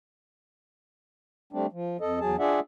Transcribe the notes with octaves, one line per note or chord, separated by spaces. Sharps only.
G3 A3 C4 D4
F3
F2 A4 D#5
E2 F#3 G#4 A5
D4 F4 G#4 D5 E5 F#5